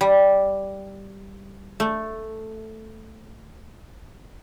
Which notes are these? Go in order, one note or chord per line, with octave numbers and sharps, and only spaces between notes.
G3
A3